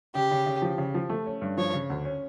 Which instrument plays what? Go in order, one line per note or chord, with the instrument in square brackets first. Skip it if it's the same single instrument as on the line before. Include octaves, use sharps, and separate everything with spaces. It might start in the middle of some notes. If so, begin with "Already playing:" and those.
[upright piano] C#3 [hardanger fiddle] G4
[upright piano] C#3
C#3
F3
C#3
F3
A3
C#4
G2
[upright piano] F3 [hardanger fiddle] C#5
[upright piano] C#3
D2
C#4